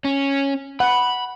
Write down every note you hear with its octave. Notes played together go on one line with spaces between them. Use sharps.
C#4
F#5 B5